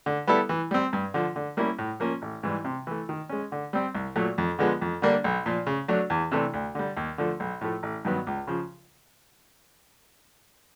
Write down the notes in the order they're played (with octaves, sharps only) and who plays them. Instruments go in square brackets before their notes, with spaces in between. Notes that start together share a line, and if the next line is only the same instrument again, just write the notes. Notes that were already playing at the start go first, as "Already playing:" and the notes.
[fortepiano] D3
G3 B3 E4 A4
E3
G3 C4
G2
D3 F3
D3
G3 A#3 C#4 E4
A2
F3 A#3 C#4
A1
G#2 E3 G3
C3
E3 A3
D#3
G#3 C#4
D3
G3 C4
C2
A#2 F#3 A3
F2
D3 F3 G#3 B3
F2
D3 G3 A#3 D4
B1
A#2 F3
C#3
F#3 A3 D4
E2
C3 E3 A3 D4
D2
D3 G3
D#2
D3 F3 A3
B1
A2 F3 A3
A1
G2 D#3 F#3 B3
C#2
C#3 F3